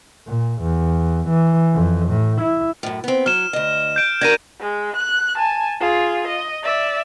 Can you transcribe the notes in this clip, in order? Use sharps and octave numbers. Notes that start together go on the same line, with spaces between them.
A#2
E2
E3
F2
A2
E4
F#2 A2
B3 C4
F#3 F6 E7
D2 D#5
G6 D7
D4 F#4 A#4 G#6 A#6 D#7
G#3
F#6
G#5 A5
F4 G#4
D#5
D5 E5